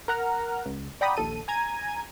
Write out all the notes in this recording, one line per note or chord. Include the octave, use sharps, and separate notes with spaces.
A#4 F#5 A#5 F6
C#2
D5 F#5 G5 A#5 B5 D#6
A#1 D#2 A4 D#7
G#5 A#5 G#6 D#7